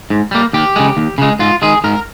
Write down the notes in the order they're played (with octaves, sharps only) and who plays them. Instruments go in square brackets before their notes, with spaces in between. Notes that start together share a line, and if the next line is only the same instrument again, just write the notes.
[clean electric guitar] G#2
G3 A#3
D#2 G4
C#3 G#3
D#2
C#3 G#3
G#2 F4
D#3 G#3 G#4
G#2 A#4